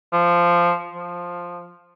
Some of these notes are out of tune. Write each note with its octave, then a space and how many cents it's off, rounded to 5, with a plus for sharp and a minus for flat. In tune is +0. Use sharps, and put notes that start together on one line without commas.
F3 -10
F3 +5